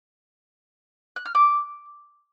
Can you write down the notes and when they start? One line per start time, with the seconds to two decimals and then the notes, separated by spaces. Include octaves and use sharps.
1.16 F#6
1.25 F6
1.35 D6